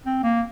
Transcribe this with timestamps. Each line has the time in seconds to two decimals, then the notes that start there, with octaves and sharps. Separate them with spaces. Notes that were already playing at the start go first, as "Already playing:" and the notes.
0.06 C4
0.23 A#3